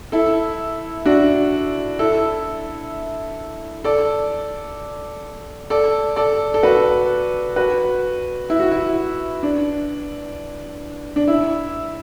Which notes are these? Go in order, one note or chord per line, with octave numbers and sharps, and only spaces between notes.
E4 A4
D4 F#4
E4 A4
A4 D5
A4 D5
A4 D5
A4
F#4 B4
F#4 B4
E4
F#4
E4
D4
D4
E4